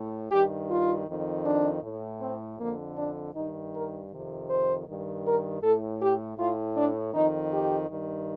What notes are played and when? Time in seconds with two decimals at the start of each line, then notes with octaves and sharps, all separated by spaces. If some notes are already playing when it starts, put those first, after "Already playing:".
Already playing: A2
0.31 G2 D#3 G4
0.69 F4
1.08 F2 D#3
1.46 D4
1.83 A2
2.21 C4
2.59 F2 D3 A#3
2.97 D4
3.35 G2 D#3 D#4
3.73 A#4
4.11 F2 C3 D#3
4.49 C5
4.87 G2 D#3
5.25 A#4
5.63 A2 A4
6.01 G4
6.38 A2 F4
6.76 D4
7.14 F2 D#3 D#4
7.53 G4
7.90 G2 D#3